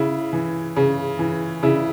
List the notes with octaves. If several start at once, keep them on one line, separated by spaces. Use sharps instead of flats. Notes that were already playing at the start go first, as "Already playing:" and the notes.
Already playing: C#3 E4
E3
C#3
E3
C#3 E4